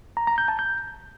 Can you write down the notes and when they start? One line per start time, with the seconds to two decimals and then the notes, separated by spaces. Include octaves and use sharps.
0.17 A#5
0.27 A#5
0.38 G6
0.48 A5
0.59 G6